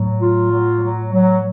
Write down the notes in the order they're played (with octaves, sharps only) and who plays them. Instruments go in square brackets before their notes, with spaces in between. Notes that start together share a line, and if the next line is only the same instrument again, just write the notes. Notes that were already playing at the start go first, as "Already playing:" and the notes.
Already playing: [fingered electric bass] A2 [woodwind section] F#3
[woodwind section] F4
F#3
F#3
F#3